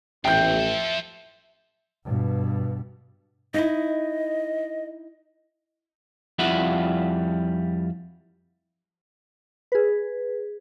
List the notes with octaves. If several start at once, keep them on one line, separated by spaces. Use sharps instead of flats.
A1 E2 A#2 E5 G5 G6
F3 A4
G2 B2
D#4 E4 D#5
F2 G3 E4 F4 E5 F#5
G#4 B4